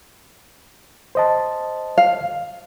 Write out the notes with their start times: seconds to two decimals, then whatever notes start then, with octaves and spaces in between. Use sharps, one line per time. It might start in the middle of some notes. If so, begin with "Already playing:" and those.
1.15 C5 D#5 A5
1.98 F5